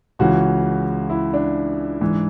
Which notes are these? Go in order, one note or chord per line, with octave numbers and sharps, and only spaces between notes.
C#2 C#3 E3 F#4
E4
D4
G#2 E3